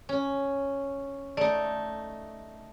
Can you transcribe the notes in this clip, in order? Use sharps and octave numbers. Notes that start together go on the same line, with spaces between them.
C#4
A3 D#4 D5